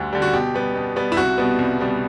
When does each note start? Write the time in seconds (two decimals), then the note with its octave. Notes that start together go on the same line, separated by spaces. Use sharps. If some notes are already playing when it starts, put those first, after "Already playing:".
Already playing: D2 D3 G3
0.13 D3 G3
0.22 F#4
0.33 B2 G4
0.55 G3 B3
0.75 B2
0.96 G3 B3
1.12 E4
1.17 C2 F#4
1.38 B2 G3 B3
1.59 C2
1.79 B2 G3 B3